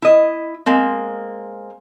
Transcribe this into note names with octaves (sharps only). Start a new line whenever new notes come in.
E4 D#5
G#3 A#3 C4